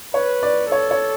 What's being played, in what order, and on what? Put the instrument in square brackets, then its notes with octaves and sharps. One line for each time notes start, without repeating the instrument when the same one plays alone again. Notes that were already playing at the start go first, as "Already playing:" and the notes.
[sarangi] B4 [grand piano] C#5
[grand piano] D5
[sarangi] A4 [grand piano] C#5
[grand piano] C#5